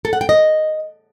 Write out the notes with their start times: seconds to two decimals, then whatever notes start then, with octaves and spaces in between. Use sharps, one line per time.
0.05 A4
0.13 F#5
0.21 G5
0.29 D#5